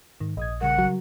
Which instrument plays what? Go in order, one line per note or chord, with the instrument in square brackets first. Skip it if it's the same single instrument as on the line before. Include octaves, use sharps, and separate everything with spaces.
[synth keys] G#2 [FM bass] D#3
[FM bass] A#1 [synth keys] D#5 D#6 G#6
[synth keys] C#3 G3 A#4 [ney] F#5
[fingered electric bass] F#3